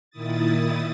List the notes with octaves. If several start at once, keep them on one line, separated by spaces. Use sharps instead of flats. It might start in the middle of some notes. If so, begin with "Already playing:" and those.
A#2 D#3 E4 D#6 A6